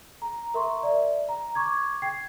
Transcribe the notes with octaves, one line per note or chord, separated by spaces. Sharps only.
A#5
A#4 E5 A#5 C6 C#6
D5 E5
A#5
C#6 D6 G#6
G5 G#6 C7